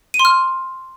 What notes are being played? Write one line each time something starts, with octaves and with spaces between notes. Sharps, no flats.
D#7
C6
F6